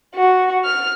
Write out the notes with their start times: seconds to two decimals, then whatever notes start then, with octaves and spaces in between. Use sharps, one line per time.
0.15 F#4
0.65 F6